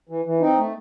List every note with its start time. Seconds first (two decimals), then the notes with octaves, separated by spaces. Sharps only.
0.09 E3
0.25 E3
0.40 C4 D#4
0.57 A3